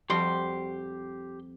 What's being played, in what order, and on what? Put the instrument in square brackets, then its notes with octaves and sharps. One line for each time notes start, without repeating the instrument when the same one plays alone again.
[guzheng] F2 G3 F#4 [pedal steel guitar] G4 C6